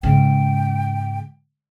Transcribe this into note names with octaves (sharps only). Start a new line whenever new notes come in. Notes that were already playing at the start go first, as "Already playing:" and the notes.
G#2 C#3 G5